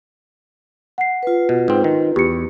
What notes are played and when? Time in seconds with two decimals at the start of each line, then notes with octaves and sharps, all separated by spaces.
0.98 F#5 C7
1.23 F4 B4
1.49 B2
1.68 G#2 C4
1.84 D#3
2.16 E2 G4 C#7